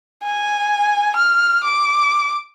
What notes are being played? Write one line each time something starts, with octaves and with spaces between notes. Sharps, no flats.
G#5
F6
D6